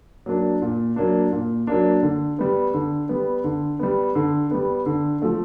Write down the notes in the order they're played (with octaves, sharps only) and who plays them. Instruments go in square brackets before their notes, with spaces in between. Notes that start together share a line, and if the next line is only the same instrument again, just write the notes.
[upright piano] F#3 A#3 D4
A#2
F#3 A#3 D4
A#2
F#3 A#3 D4
D3
G3 B3
D3
G3 B3
D3
G3 B3
D3
G3 B3
D3
F3 A3